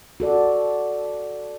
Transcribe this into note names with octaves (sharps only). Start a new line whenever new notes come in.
F#4 A4 D5